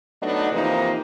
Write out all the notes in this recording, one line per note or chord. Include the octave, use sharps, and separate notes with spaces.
F#3 A3 B3 D4 D#4 D#5
C3 E3 F3 A#3 D#4